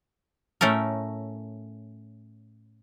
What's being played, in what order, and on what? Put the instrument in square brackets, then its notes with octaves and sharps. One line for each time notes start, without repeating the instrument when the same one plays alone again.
[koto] A2 A3 C#4 A4 A#4